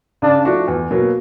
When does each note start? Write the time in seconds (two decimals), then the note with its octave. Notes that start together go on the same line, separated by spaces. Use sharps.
0.22 C#3 D4
0.45 F3 A3 D4 F#4
0.68 E2
0.91 B2 F#3 A#3